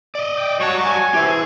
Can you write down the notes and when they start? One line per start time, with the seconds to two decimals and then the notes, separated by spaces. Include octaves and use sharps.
0.15 D5 D#5
0.37 G5 D6
0.60 F#3 G3 F#4 C#5 A5 C#6
0.84 G#5
1.14 E3 E4 G4 C5
1.29 G#4